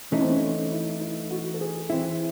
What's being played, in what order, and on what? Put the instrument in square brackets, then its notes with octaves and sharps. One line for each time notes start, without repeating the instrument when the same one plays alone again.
[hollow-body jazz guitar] E3 A3 D#4 [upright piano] C#4
[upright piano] C4
C#4
C#4
E4
E4
F#4
A4
G#4
[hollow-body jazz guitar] E3 C4 E4